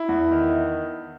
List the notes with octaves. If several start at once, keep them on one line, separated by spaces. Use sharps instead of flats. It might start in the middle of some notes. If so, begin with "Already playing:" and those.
Already playing: E4
E2
D#3